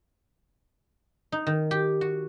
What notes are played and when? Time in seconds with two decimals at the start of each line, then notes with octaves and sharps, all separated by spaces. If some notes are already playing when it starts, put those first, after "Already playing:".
1.32 D#4
1.47 D#3
1.71 G4
2.01 F#4